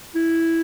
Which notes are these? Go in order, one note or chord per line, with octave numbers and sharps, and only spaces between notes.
E4